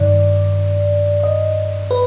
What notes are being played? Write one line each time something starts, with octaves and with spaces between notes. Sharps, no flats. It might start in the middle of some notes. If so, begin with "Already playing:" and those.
Already playing: G2 D#3 D5
D#5
B4